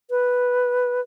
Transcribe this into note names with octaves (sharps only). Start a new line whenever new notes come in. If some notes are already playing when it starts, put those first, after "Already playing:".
B4